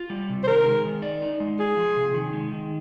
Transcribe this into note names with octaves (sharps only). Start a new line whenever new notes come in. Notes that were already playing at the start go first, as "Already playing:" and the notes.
Already playing: F4
G3
C3
C5
D#3 A#4
G#3
D#3
D5
D#4
G#3
F4 G#4
F3
C3
D#3
G#3
D#3